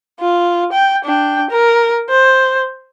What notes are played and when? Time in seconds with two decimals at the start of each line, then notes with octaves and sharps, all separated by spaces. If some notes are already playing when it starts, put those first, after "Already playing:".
0.20 F4
0.72 G5
1.05 D4 G5
1.50 A#4
2.10 C5